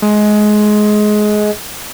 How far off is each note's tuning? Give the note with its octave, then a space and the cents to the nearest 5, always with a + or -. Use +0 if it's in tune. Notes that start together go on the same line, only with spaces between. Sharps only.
G#3 +20